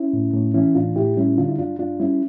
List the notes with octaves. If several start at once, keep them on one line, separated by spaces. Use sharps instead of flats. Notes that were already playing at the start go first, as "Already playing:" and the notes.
Already playing: C#4 E4
A2
A2
E3 C#4 E4
A2 D4 F4
A2 E4 G4
G3 C#4 E4
D3 D4 F4
E4
G2 D4 F4
G2 D4 F4
G3 C#4 E4